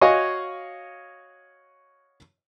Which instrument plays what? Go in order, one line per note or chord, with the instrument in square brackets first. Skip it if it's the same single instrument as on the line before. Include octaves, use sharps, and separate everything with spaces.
[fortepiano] F#4 C#5 D#5 F5 G#5 C#6